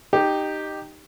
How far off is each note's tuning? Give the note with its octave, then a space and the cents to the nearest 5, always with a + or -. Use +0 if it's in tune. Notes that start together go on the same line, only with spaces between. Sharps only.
D#4 -15 G4 +0